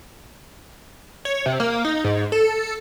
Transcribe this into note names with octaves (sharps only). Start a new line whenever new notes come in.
C#5
C3
A#3
D#4
G#2
A4